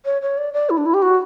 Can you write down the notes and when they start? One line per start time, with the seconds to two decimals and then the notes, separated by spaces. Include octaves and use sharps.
0.05 C#5
0.22 C#5
0.38 D5
0.53 D5
0.70 E4
0.78 D4
0.86 E4
0.94 G4
1.02 F#4